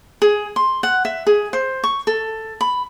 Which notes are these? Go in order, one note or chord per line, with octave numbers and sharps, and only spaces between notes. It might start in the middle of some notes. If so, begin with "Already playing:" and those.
G#4
C6
F#5
E5
G#4
C5
C#6
A4
B5